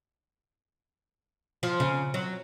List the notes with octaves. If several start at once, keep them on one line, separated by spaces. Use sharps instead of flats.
F3
C#3
F#3